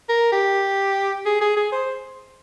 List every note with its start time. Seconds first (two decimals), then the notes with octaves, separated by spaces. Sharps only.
0.09 A#4
0.32 G4
1.26 G#4
1.41 G#4
1.56 G#4
1.72 C5